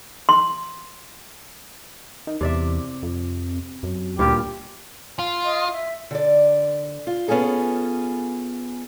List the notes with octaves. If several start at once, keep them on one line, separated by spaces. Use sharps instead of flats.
C6
D#3
E2 C3 D5 E5
F2
F#2
D2 G2 A#2 F4 G4
F4
D#5
E5
D3 D5
F4
B3 C#4 F4 G#4 A4